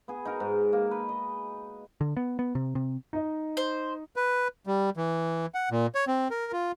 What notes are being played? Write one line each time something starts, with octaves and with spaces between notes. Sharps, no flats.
B3 G#4
D#4 F#4 A#4
G#2
A#3
B4
D#5
D3
B3
B3
C3
C3
D#4 D#5
C5
B4
G3
E3
F#5
A#2
C#5
C4
A#4
F4